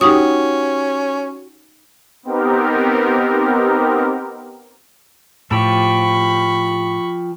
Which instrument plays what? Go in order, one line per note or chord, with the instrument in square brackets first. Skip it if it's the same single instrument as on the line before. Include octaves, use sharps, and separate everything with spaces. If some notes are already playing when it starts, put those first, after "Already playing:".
[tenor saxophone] C#4 [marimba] D#4 C#6 D#6 [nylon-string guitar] F#4 G4
[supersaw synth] B3 C4 D#4 G4 A#4
[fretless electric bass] A2 [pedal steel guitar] F3 G4 A4 [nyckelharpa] B5 C#6